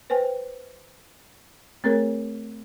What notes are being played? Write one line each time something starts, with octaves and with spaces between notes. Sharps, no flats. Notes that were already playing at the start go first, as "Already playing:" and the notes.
B4 C5 G5 G#5
A3 C4 G#4 A#4 C#5